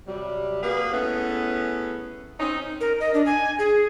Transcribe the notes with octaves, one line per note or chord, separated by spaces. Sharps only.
C3 F#3 G3
A#3 F#4 G#4 B4
A3 B3 C#4 E4 G#4
C4 C#4 D#4
A#4
D#5
D4
G#5
G#4